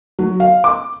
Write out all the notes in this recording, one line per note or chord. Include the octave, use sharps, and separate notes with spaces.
F#3
F5
D6